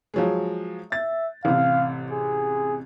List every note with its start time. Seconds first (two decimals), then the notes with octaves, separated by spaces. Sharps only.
0.14 F3 F#3 G#3
0.92 E5 A6
1.45 A1 C3 F5
2.12 G#4